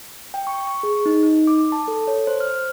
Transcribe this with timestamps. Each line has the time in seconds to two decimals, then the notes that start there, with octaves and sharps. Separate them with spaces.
0.34 G5
0.47 C#6
0.67 C#6
0.83 G#4
1.06 D#4
1.23 D#4
1.47 D6
1.72 A5
1.88 A4
2.08 C#5
2.27 C5
2.40 F6